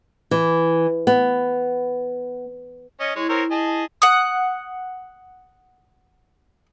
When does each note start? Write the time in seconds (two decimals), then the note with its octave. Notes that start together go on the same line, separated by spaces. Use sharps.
0.31 E3
1.07 B3
3.00 C#4 D#5
3.16 G#3 E4 C#5
3.29 C4 A#4 C#5
3.51 G#4 D#5 A5
4.02 F#5 D#6